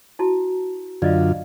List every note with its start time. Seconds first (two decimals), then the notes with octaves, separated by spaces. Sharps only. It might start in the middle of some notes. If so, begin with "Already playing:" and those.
0.19 E4 F#4 A5
1.02 F#2 D3 F4 D5 D#5 F5